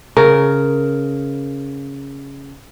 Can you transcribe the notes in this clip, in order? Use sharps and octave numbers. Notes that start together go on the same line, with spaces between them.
C#3 A#4